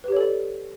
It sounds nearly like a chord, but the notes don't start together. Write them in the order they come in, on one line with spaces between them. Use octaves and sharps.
B4 G4 C#5 A4 D5